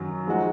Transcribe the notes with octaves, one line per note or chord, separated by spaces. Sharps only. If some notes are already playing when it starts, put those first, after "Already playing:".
Already playing: F#2 D#3 F#3
F3 G#3 D#4 F#4